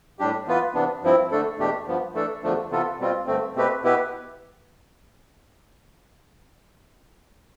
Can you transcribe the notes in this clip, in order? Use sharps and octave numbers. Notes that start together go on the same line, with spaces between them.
A2 G3 D4 G4
E3 B3 F4 B4
C3 E3 B3 D4
G2 F3 C4 E4
D3 A3 D4 A4
E2 B2 A3 D4 G4
G2 F3 B3
E3 A3 D4 A4
E2 D3 F3 A3 D4
C3 E3 B3 F4 A4
B2 G3 C4 F4
G2 D3 A3 C4
B2 A3 C4 G4 B4
B2 B3 E4 G4 B4